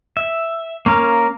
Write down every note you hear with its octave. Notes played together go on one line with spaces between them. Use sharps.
E5
A#3 C#4 A#4 F5